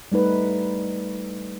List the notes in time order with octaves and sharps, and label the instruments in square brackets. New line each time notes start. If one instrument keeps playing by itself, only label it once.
[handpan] G3 A3 D#4 B4